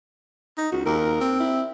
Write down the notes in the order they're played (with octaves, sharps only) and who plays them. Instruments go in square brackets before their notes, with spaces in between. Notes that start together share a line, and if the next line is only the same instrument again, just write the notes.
[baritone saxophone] D#4
[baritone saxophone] C#2 [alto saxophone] F#4
[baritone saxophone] D#2 [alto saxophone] A#4
[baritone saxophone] C4
[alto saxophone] E4